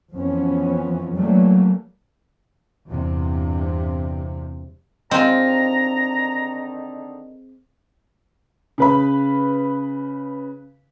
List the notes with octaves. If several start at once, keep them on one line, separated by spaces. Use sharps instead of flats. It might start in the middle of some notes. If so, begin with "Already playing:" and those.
F2 E3 F3 B3 C#4
E3 F#3 G3 A3 A#3
E2 G2 C3
D3 D#3 G#3 C4 D#4 F4 A#5
C#3 B4 B5